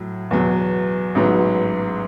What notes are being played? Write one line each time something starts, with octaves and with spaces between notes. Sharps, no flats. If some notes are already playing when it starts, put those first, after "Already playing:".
Already playing: A2 F#3
E2 B2 F#3
A1 G#2 F#3 B3